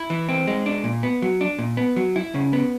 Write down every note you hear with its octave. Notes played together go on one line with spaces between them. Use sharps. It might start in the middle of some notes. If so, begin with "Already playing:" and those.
Already playing: E4
E3
C4
G#3
D4
A#2
B3
F#3
D4
A#2
B3
F#3
E4
C#3
B3